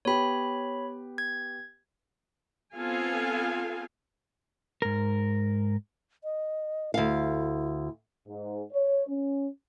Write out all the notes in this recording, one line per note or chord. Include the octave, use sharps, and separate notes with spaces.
B3 G4 C#5 B5
G#6
B3 C4 F4 A4 F5 G#5
G#2 A#4
D#5
D2 E4 F5
G#2
C#5
C#4